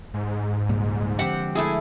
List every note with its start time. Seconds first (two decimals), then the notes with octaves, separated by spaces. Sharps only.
0.14 G#2
0.69 C#2 A#2 G3
1.19 D3 F3 G#3 C4 G4 F#5
1.55 A3 E4 G#4